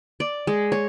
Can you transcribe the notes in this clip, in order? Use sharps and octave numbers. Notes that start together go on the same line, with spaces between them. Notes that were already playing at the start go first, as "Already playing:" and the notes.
D5
G#3
C#5